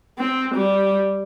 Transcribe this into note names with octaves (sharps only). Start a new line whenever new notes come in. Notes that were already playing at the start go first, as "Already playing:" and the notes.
C4
G3